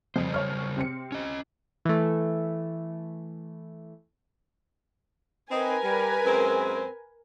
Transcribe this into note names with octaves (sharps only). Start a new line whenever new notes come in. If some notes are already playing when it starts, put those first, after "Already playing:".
F2 C#3 G3 C5
C#5 F6
C3 C4 C#7
C#4 D#5
E3 A3
C4 D#4 A#4 B4 G#5
G3
F#2 G#3 C4